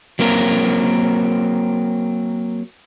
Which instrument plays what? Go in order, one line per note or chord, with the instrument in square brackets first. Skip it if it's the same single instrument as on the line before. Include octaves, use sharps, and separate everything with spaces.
[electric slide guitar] F#3 A#3 C4 A#4